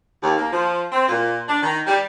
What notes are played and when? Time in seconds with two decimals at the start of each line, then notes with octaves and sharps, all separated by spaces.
0.22 D#2
0.37 A#3
0.51 F3
0.92 C4
1.09 A#2
1.47 D4
1.63 D#3
1.86 G3